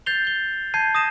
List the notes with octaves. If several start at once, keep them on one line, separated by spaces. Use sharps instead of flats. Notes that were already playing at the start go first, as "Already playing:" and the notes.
G6 A6 C7 F7 G7
G6 G7
A5 G6 G#6 C7 D#7
D#6 A#6 D#7 E7